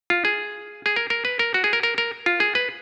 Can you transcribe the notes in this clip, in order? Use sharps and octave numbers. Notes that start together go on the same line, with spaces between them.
F4
G#4
G#4
A#4
A#4
B4
A#4
F#4
G#4
A#4
A#4
A#4
F4
G#4
B4